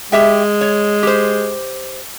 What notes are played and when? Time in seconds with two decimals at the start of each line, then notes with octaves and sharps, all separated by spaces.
0.12 G#3 G4 E5 G5
0.61 C#5
1.03 G4 C5